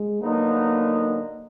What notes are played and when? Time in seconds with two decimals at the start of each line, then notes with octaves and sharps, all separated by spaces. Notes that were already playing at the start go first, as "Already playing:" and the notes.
Already playing: G#3
0.22 D3 F#3 A#3 B3 D#4